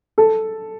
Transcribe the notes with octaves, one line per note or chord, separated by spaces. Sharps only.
A4